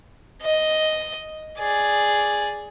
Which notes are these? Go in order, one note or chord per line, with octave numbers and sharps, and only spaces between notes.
D#5
G#4 D5